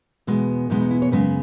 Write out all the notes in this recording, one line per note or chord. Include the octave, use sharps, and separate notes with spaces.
E2 B2 G#3 B3
E2 B2 G#3 B3 D#4
D#4
E4
C#5
F#2 C#3 G#3 B3 B4